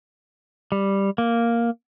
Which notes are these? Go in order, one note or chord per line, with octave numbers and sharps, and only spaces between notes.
G3
A#3